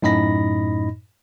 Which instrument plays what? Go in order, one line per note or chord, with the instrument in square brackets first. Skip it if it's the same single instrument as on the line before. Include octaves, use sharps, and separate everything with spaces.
[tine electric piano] F#2 A2 D#4 D#5 B5 A#6